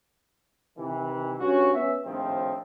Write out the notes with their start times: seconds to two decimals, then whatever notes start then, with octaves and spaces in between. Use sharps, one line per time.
0.78 C3 D#3 E3
1.40 G2 C#4 F#4
1.74 B3 C#4 E5
2.04 A#1 A2 D#3 F3 C4